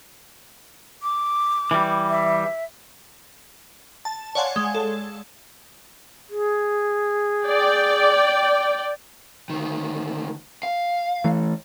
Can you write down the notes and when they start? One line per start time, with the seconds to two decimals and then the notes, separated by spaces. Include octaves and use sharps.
1.03 D6
1.71 E3 G3
2.09 E5
4.05 A5
4.35 C#5 D5 F5 F#5 G#5 C6
4.56 G#3
4.75 A4
6.30 G#4
7.43 D5 G5
9.50 D2 D#3
10.63 F5
11.24 E3 A3